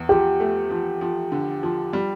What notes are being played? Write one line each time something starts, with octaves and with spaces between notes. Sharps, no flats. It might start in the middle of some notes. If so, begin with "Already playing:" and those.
Already playing: E2
F3 G4
A3
F3
F3
D3
F3
G3